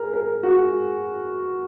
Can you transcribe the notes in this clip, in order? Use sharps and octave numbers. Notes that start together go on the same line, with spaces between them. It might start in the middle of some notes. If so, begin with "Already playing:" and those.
Already playing: G#4 A#4
A#4
F#4